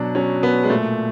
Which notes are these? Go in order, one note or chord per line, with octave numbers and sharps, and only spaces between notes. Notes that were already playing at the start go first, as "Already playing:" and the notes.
Already playing: B2 F#3 D4
F#3 C#4
B2 B3
G#3
A#2 A3